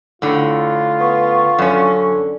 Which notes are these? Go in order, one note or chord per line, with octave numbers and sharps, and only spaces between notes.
A2 D3 F4
B3 C#6
F#2 D3 C#4